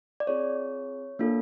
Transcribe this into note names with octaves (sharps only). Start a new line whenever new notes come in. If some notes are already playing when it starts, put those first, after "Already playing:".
D5
C4 F4 G#4 C#5
A#3 D4 F4 A4